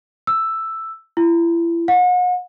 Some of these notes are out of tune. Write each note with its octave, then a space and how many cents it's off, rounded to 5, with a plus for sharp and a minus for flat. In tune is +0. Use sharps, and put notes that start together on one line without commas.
E6 +5
E4 +35
F#5 -40